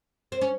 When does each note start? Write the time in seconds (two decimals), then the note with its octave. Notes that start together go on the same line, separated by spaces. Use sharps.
0.32 C4
0.41 C#4